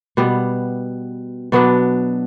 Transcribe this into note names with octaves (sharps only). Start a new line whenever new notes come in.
B2 G3 B3
B2 F#3 B3 D4